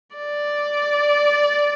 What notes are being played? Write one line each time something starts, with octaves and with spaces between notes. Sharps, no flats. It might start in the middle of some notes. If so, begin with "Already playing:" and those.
D5